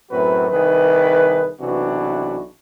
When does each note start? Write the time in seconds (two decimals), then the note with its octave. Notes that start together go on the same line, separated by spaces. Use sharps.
0.11 F#2 A2 F#3 C4 F#4 B4
0.51 C2 D#3 G#4 B4
1.59 B1 C3 E3 D4 F#4